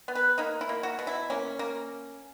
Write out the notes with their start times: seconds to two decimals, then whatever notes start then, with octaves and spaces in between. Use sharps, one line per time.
0.08 B3
0.15 B4
0.38 A#3 D#4
0.61 E4
0.69 A#3
0.83 F#4
0.99 B2
1.07 E4
1.30 A#3 C#4
1.59 A#3